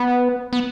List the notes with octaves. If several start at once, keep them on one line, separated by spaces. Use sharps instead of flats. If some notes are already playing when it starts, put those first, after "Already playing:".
Already playing: B3
B3